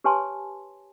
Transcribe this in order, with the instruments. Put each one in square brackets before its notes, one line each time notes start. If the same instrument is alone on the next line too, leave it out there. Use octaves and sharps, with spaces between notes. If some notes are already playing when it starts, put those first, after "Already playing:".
[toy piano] G4 B4 C#5 G#5 A5 C6